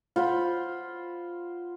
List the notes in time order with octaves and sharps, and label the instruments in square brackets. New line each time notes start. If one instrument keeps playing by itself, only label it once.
[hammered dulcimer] F4 C5 F#5 B5